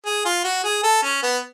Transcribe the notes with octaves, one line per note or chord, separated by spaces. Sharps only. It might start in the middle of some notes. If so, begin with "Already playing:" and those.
G#4
F4
F#4
G#4
A4
C#4
B3